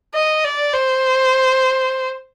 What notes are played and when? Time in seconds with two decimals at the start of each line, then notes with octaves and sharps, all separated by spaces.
0.15 D#5
0.45 D5
0.74 C5